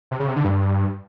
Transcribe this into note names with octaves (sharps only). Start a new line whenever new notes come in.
C3
C#3
C3
D3
G2